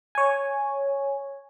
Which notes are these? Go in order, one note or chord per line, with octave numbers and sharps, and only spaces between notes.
C#5 G#5